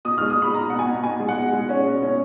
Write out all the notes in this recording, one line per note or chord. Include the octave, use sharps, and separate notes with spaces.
B2 D#6
F6
G#3
D#6
B2 B5
B2 A#5
B2 F#5
G#5
B2
B2 G#5
G#3
F#5
B2
G#3
C#4
B2
C#4